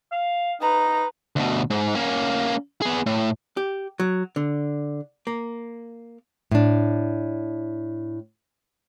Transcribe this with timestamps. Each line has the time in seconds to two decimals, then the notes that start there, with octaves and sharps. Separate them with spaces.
0.12 F5
0.61 D#4 B4 A#5
1.36 D2 B2
1.70 G#2
1.95 A#3 C#4
2.82 B3 G#4
3.06 A2
3.57 G4
4.00 F#3
4.36 D3
5.27 A#3
6.51 A2 D4